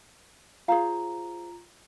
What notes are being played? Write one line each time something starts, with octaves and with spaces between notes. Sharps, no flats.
F4 G#4 C5 F5 A#5